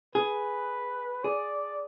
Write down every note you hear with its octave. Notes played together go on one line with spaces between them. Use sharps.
G#4 B4
G#4 D5